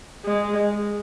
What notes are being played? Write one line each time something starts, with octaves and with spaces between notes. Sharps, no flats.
G#3